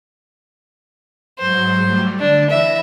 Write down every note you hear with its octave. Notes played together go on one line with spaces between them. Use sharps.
G#2 F#3 C5
F#3 G3 A3
D3 D4
E3 E5 B5 A#6